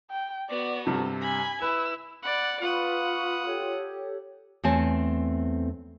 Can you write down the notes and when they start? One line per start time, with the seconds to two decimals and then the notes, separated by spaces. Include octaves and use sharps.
0.11 G5
0.50 B3 F#4 D5
0.87 G2 C3 A4
1.22 G#5 B5 G#6
1.62 E4 B4 E6
2.22 D5 F#5 B5
2.61 F4 B4 F#5 B5 C#6 D#6
3.46 G4 A4 C#5
4.63 E2 A3 C4 C#5 G#5 A5